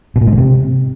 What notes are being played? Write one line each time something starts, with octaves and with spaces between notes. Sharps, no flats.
B2
A#2
G#2
D3
C3